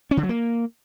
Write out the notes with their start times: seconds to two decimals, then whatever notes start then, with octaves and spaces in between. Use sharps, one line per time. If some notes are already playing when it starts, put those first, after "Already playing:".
0.11 C#4
0.17 D3
0.23 F#3
0.29 A#3